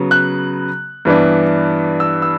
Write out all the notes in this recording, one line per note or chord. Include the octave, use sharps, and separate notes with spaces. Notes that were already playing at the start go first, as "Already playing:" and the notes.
Already playing: C#3 F#3 B3
F#6
G2 E3 B3 D4
E6
E6